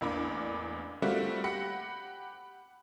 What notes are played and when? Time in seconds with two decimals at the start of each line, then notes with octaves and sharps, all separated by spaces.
0.01 A1 E2 A#3 D4 B5 D6
1.02 G3 A3 A#3 C4 F4 F#4
1.44 G4 F#5 B5 A#6 C#7